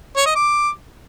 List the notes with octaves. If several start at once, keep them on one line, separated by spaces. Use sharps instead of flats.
C#5
D#5
D6